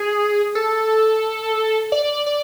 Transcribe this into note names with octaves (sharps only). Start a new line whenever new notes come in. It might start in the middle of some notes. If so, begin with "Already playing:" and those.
Already playing: G#4
A4
D5
D5